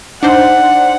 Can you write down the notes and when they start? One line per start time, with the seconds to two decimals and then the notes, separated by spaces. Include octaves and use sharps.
0.23 D4 D#4 C5 F#5